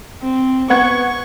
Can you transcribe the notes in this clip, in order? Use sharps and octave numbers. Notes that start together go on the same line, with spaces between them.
C4
B3 F#5 C#6 G#6